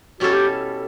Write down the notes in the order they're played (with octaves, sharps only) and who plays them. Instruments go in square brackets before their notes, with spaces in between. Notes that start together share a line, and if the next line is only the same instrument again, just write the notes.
[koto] B2 G3 C#4 E4 A4 [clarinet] F#4
[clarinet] G4